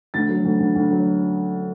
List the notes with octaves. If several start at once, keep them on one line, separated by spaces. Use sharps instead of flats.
D2 A6
F#3
D2
D2
D2
F#3